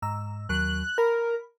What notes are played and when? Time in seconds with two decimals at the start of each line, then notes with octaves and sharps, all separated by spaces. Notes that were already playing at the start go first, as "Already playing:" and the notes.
0.02 G#2 A#5 E6
0.49 D#2 F#3 F#6
0.98 A#4 B5